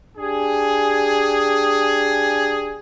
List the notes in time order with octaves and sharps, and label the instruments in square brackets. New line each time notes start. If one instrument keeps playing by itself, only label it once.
[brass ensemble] D4 G4 G#4